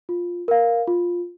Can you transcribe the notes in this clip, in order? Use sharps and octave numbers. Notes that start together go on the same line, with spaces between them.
F4
A#4 F5
F4